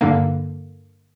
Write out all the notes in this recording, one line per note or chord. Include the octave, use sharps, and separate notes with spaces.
G2 D3 A#3